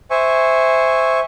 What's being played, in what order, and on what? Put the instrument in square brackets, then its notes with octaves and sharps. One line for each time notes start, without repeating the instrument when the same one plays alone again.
[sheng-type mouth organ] C5 E5 G#5 C#6